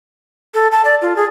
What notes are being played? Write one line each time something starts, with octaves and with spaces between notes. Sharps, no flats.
A4
A5
D5
F4
G#4